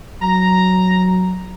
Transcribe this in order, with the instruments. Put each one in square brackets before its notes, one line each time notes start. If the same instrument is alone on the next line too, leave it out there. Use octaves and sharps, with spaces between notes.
[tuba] F#3 [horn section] A#5